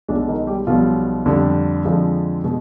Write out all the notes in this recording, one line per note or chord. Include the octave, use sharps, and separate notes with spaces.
B1 B2 G#3 D4
D#3 D#4
G3 G4
B1 B2 F3 G3 F4
F2 D3 G3
F2 D3 F3 G#3
B2 G#3